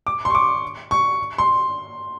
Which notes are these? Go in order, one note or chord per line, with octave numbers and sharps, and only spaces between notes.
D6
C6
C#6
D6
C#6
C6